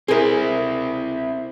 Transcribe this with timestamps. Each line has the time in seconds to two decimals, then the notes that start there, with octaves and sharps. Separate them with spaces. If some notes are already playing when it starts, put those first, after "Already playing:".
0.08 C4 E4 G#4 A#4